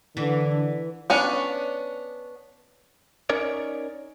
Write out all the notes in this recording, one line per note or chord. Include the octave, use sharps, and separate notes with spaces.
D3 E3
B3 C#4 D4
C#4 D#4 A#4 C#5 D5